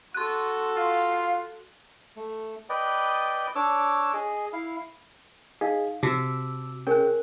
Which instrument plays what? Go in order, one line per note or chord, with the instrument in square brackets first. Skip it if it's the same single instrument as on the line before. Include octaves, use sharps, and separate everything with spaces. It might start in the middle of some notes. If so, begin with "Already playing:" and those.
[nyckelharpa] F#4 A4 [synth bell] C6 F#6
[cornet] F4 [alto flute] F5
[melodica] A3
B4 D5 D#5 G5
D4 C#5 D6 E6
G#4 D#5
E4 F5
[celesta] D#4 F5 [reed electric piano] G#4 D#5
[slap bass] C3 [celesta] F#4 A5 [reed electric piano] D6 E6
[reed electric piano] C#4 G#4 G5 [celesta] A#4 G#5 F#6